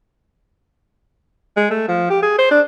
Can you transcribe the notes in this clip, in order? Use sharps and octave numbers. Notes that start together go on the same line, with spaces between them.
G#3
A3
F3
G4
G#4
C5
D4